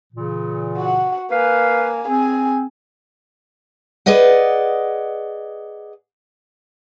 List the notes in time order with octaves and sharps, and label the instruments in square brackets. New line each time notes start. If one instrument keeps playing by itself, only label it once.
[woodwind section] A#2 C#3 E3
[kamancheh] F#4 F#5
[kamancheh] A#3 G#5 [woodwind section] B4 F5
[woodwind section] C4 [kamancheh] G#4 G#5
[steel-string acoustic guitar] G#4 B4 D5 D#5 F#5